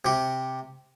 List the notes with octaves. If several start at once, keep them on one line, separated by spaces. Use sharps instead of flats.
C3 G4